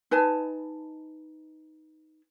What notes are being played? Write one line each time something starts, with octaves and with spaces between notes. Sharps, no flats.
D#4 B4 G#5 A5